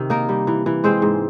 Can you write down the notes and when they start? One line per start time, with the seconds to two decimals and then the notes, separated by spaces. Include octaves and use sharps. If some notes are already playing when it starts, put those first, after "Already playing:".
Already playing: C3 D#3
0.10 A#3 D#4 A#4
0.29 G3
0.47 E3
0.66 E3
0.84 G#3 C4 C5
1.02 G#2